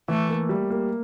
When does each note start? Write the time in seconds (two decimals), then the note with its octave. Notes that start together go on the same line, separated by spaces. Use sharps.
0.08 E3 A3
0.29 A#3
0.49 G3
0.70 A#3